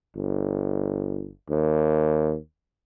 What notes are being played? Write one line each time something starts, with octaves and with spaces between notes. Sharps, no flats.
G1
D#2